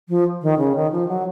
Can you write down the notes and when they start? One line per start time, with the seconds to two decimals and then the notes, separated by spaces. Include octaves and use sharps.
0.09 F3
0.42 D#3
0.58 C#3
0.75 D#3
0.92 F3
1.08 F#3